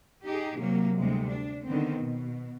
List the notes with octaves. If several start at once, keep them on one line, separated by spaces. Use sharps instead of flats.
D#4 G4 G#4
C3 F#3 A#3
D2 C3 G3 G#3
D4
D3 D#3 B3 C4
B2